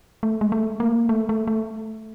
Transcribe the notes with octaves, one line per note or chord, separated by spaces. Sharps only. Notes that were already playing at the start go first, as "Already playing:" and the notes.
A3
G#3
A3
A#3
A3
A3
A3